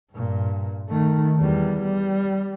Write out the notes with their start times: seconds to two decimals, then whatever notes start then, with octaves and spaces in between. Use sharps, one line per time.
0.13 G2 A#2
0.90 D#3 A3
1.39 E2 G3
1.82 G3